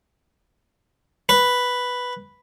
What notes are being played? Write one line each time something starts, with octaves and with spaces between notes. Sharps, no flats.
B4